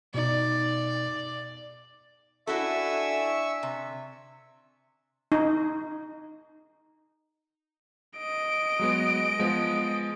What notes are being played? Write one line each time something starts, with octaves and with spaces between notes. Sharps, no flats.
B2 D#4 D5
D4 E4 F#4 A4 E5 G#5 C#6 E6
C3
D#4
D#5 D7
F#3 G#3 B3
F3 G#3 B3